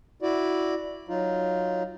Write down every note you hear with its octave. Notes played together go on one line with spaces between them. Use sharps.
E4 F#4 D5
F#3 D#4 F4